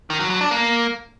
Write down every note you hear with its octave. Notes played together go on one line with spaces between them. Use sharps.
D#3
F#3
F#3
D4
A#3